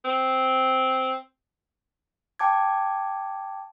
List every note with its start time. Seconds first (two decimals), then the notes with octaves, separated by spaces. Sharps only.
0.05 C4
2.39 G5 A5 D6 G#6